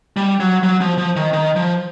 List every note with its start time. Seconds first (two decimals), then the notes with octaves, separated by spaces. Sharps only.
0.17 G3
0.40 F#3
0.63 F#3
0.81 F3
0.98 F3
1.16 D#3
1.33 D#3
1.56 F3